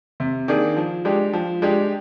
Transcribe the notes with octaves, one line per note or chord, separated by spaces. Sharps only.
C3
D#3 A#3 D4 G#4
F3
G#3 D4 G4
F3
G#3 D4 G4